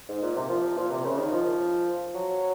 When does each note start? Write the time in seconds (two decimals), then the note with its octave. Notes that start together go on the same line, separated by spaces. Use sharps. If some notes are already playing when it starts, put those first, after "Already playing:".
0.09 G#2
0.22 A#2
0.36 C3
0.49 F3
0.77 A#2
0.91 C3
1.05 C#3
1.18 D#3
1.32 F3
2.15 F#3